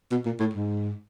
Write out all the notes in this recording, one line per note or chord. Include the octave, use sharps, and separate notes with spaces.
B2
A#2
A2
G#2